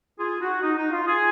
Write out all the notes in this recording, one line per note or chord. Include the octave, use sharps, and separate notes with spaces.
F4 G#4
D#4 F#4
D#4
D#4
F4
F4 G#4